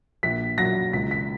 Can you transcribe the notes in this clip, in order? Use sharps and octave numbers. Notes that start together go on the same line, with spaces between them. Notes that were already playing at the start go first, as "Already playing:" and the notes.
A#1 B6
A#2 F#3 A#6
C#2 B6
B6